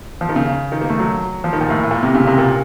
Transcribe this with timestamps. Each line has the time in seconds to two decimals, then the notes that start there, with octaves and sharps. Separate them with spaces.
0.21 F3
0.29 D#3
0.36 C#3
0.72 D#3
0.81 A#3
0.89 A3
0.99 F#3
1.44 F3
1.53 D#3
1.61 A#2
1.70 A2
1.83 A2
1.91 A#2
2.03 C3
2.15 C#3
2.27 C3
2.39 A#2